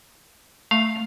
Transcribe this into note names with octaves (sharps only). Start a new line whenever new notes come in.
A3 F5